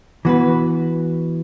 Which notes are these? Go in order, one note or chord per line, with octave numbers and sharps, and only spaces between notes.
E3 B3 F#4 B4